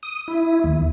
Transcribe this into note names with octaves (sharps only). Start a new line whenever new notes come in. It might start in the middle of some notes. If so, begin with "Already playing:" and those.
D#6
E4
D#2